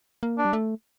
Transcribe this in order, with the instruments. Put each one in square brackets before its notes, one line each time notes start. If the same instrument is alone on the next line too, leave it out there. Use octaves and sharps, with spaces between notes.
[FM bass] A#3
[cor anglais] D4
[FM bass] G3
A3